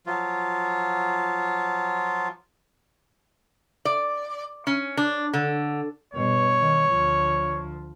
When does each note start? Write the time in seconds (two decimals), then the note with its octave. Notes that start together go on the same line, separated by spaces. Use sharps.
0.07 F3 F#3 F4
3.85 D5
4.67 C#4
4.97 D4
5.34 D3
6.14 G2 B2 C#5
6.59 D#3
6.89 D2 F3